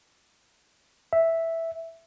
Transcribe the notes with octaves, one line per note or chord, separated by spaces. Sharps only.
E5